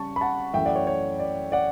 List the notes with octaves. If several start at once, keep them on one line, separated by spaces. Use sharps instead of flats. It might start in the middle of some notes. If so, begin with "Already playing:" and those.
Already playing: C#3 G3 C#4 A5 C#6
B5
F#5 A5
F#2 E3 A3 C#4 E5 G5
D5 F#5
C#5
C#5
D5
D5 F#5